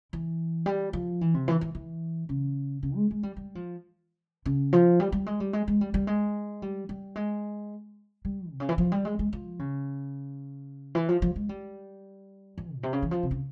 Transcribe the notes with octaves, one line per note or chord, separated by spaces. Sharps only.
E3
G3
F3
E3
C3
E3
E3
E3
C#3
C#3
G#3
G#3
G3
G3
F3
C#3
F3
G3
G3
G#3
G3
G#3
G#3
G3
G3
G#3
G3
G3
G#3
G3
C3
C#3
E3
F3
G3
G#3
G#3
F3
C#3
E3
F3
F3
G#3
G3
F3
A#2
C3
C#3
E3
F3
C3
C#3